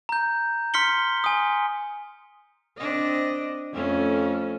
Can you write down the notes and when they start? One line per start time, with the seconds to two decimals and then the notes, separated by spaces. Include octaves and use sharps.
0.09 A#5 G6
0.74 C6 F6 B6 C#7 G7
1.24 G#5 D#6
2.77 C4 D4 D#5
3.73 F2 A3 C#4